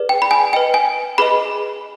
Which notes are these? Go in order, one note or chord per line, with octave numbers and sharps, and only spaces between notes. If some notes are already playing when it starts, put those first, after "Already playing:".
Already playing: G#4 B4 D5
G5
B5
G#5
B4 D#5 G5
G#5
G#4 B4 D#5 B5